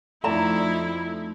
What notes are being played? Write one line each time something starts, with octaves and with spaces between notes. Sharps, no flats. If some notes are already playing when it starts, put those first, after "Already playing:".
F2 A3 D#4 E4 D5 A5 A#5